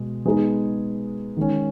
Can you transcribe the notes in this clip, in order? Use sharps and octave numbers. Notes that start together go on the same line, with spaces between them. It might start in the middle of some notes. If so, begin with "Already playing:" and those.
Already playing: B2 G#3
G#3 B3 D#4 G#4
D#3 G#3 C#4